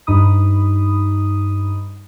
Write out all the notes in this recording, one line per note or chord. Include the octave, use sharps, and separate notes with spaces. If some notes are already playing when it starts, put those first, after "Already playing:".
G2 D#4 B5 D#6